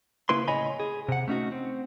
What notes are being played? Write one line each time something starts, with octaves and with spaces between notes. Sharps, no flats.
C#3 A#3 E4 B4 C6
A2 C#3 C#5 D#5 G#5 B5
G#4
C3 F#5
A3 C#4 D#4 F#4
C4